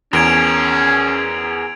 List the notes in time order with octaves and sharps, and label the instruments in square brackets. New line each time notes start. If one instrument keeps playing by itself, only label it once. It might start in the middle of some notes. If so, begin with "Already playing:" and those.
[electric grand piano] E2 [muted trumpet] C#4 [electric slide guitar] G#4 A#4 [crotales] G#6 D7 F7